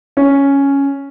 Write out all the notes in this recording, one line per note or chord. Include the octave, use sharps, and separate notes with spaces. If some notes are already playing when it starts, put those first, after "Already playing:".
C#4